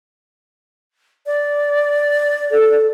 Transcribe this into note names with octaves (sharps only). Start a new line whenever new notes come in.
D5
A4